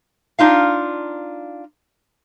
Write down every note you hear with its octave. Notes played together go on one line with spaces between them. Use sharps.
D4 D#4 F4 F5